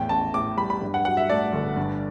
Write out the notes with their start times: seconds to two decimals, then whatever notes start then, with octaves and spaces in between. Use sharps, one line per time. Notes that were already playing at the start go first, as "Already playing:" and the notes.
Already playing: E2 A2 G5
0.09 A1 A5
0.34 A2 D6
0.57 G3 B5
0.70 B5
0.81 G2
0.94 F#5
1.05 F#3 F#5
1.17 E5
1.30 A3 D5
1.53 G1
1.76 G2